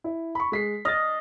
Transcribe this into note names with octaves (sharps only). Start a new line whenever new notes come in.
E4
B5 C#6
G#3 B6 C7
D#5 F6 A6